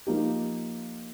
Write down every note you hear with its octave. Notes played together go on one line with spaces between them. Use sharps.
F3 A#3 D#4 G4